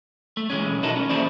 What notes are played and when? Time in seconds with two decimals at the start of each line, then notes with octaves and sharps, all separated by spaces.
0.37 A3
0.50 E3 G#3 C#4
0.69 B1
0.83 D#4 E4 F#4 A4 A#4 D#5
0.96 C#4
1.10 E3 A#3 E4 G#4 C5 D5